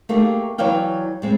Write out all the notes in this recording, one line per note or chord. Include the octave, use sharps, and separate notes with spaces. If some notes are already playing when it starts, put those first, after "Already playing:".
A3 A#3 D#4 G4 G#4
E3 F#3 C#5 D5 F5 G5
G3 G#3 C4